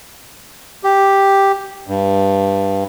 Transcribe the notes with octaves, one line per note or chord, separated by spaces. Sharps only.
G4
G2